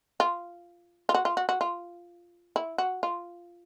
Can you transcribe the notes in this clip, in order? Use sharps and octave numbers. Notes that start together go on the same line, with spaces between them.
F4
F4
F#4
F4
F#4
F#4
F4
E4
F#4
F4